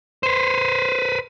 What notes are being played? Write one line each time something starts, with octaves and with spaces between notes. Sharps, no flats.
B4 C5